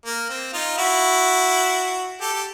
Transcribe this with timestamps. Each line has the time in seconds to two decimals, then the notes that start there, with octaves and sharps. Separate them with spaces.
0.06 A#3
0.30 C4
0.54 D#4 F4
0.78 E4 F#4
2.21 G4 A4
2.34 G4